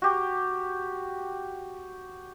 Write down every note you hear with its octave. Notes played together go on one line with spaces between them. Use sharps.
F#4 G4